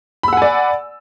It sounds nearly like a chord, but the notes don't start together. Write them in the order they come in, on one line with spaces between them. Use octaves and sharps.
B5 E6 F#5 G#5 D5